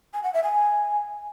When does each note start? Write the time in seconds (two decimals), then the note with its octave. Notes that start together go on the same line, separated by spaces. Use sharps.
0.14 G#5
0.23 F#5
0.34 E5
0.44 G#5